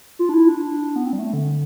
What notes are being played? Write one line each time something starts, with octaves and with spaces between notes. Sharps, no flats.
F4
D4
E4
D4
B3
C4
G3
A3
D3